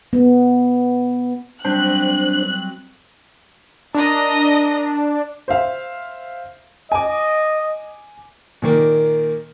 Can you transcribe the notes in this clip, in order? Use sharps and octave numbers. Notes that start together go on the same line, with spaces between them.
B3
F#3 G3 C4 D4 C5 F#6
D4 A#4 D#5
C5 E5 F5
D#5 G#5 D6
A#2 D#3 A#3